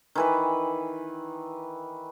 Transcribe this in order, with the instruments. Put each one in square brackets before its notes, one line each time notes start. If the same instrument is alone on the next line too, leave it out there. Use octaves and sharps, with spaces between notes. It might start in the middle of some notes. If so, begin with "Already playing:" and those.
[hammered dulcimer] D#3 E3 B4